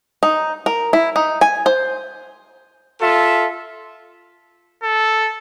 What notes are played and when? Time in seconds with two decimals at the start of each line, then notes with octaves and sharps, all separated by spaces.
0.23 D#4
0.66 A#4
0.93 E4
1.16 D#4
1.41 G#5
1.66 C5
3.00 F4 A4 E5
4.83 A4